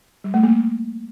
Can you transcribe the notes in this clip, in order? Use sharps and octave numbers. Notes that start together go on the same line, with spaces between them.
G3
A3
A#3